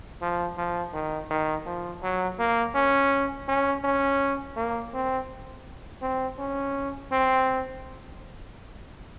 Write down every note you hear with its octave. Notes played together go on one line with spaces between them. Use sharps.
F3
F3
D#3
D#3
F3
F#3
A#3
C#4
C#4
C#4
A#3
C4
C4
C#4
C4